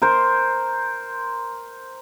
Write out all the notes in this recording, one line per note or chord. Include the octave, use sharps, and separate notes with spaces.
A#4 C5